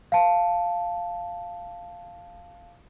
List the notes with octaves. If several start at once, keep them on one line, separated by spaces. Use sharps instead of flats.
F5 A5